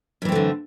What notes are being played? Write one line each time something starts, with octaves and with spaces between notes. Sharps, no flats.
F#2 D3 E3 A3 C4